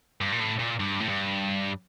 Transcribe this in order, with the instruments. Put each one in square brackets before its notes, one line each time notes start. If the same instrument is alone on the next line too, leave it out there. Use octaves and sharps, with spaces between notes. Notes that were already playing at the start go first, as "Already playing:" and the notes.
[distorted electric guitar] G2
A#2
A2
A#2
G2
A2
G2